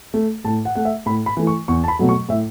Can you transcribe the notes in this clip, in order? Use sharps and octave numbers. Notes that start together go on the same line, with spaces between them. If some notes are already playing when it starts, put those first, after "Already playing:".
A3
A2 A5
F#5
A3 F#5
E5
A2 B5
B5
E3 A3
C#6
E2 C#6
A5
B5
B2 F#3 A3
C#6
A2 E5